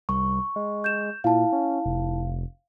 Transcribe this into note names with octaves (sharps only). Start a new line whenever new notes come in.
C2 C#6
G#3
G6 E7
A#2 E4 F5 A5
C#4
F1